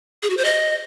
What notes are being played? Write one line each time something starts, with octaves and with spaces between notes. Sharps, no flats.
G#4
F#4
C5
D#5